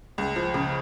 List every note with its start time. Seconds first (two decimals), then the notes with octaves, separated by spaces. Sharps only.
0.18 C#2
0.36 F3
0.54 C#3